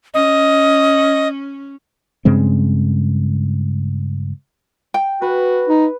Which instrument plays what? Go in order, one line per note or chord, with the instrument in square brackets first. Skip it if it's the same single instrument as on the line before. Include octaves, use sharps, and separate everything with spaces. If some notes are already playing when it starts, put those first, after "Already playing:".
[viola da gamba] C#4 [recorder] D#5
[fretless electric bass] G2 C#3 G#3 C4
[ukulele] G5
[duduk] F#4 [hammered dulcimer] B4
[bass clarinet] D#4